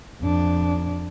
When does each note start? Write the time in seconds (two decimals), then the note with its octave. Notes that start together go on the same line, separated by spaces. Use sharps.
0.20 F2 D4